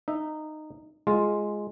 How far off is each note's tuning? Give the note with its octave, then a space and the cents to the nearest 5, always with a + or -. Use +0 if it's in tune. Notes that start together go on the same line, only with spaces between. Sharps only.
D#4 -15 E5 +0
G#3 +0 F4 +0